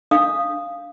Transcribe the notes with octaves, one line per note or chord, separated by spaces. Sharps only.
D4 F5 D#6